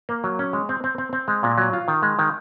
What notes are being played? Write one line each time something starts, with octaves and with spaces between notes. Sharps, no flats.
A#3
F#3
C#4
G#3
C4
C4
C4
C4
G#3
A#2
F#3
F4
D#3
G#3
D#3